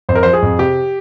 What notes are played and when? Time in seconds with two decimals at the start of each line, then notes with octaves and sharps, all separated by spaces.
0.09 F2 C5
0.15 A#4
0.23 F3 C5
0.33 G#4
0.42 F2
0.59 C3 G4